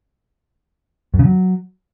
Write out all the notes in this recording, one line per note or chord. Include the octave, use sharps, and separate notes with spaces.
F#2
C#3
F#3